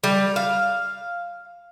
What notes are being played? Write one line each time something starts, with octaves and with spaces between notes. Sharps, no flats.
G3
F5